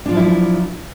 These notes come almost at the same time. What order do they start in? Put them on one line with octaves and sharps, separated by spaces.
D4 F4 F3 F#3 E4